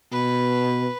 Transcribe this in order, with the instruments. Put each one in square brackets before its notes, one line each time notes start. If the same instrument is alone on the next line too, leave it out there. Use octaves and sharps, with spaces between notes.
[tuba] B2 [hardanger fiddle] B4